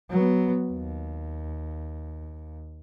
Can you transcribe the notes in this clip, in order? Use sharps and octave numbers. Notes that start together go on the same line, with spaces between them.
F#3 B3
D#2